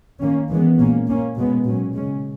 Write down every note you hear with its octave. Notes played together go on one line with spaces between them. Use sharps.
D#3 A#3 C#4
E3 G#3 B3
A#2 A#3 C#4
A#2 A#3 C#4
B2 G#3 B3
A#2 F#3 C#4
C#3 G#3 C#4